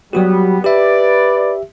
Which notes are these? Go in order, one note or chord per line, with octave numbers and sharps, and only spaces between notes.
F#3 G3 B3 F#4 G4
G4 B4 D5 E5